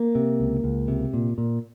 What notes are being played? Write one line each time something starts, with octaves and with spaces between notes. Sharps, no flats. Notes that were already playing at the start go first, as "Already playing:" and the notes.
Already playing: A#3
C3
C#2
C#2
C3
A#2
A#2